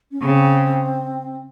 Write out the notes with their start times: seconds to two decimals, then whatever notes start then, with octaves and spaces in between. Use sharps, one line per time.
0.11 C#4
0.22 C#3 C4